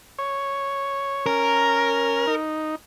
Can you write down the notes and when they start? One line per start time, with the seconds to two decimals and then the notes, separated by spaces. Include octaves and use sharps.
0.19 C#5
1.26 C#4 A#4
2.27 D#4